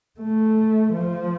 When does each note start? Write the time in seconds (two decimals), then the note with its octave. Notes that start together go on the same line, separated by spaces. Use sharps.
0.20 A3
0.94 F3